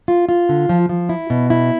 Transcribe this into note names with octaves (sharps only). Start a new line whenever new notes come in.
F4
F4
D3
F3
F3
E4
B2
E4